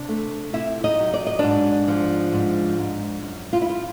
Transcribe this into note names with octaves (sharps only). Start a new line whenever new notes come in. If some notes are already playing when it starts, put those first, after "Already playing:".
Already playing: C3 D4 D5
A3
C3 E4 E5
D#4 D#5
F#3
D5
D#5
G#2 D4 D5
F3
G#2
G#2
F#2
F4
E4
F4